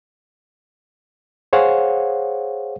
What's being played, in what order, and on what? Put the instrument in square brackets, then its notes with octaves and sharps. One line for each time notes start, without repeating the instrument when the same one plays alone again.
[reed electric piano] G#4 C5 C#5 F5 F#5